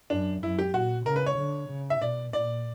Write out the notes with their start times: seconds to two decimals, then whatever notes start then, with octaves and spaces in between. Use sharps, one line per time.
0.10 F#2 D4
0.42 F#2 E4
0.59 G4
0.74 A#2 F#4
1.05 C#3 A#4
1.16 B4
1.26 C#5
1.37 D3
1.69 C#3
1.90 E5
2.00 B2 D5
2.33 A#2 D5